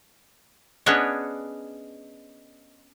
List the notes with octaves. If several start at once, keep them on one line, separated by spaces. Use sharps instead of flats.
B3 C#4 D4 G#4 C#5 D#5